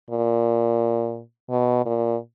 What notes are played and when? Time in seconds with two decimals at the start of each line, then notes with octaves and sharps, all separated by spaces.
0.10 A#2
1.50 B2
1.86 A#2